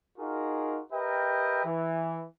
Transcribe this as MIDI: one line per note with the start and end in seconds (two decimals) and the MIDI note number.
0.18 0.81 63
0.18 0.81 65
0.18 0.81 66
0.18 0.81 68
0.18 0.81 70
0.92 1.62 67
0.92 1.62 70
0.92 1.62 71
0.92 1.62 75
0.92 1.62 76
0.92 1.62 79
1.65 2.24 52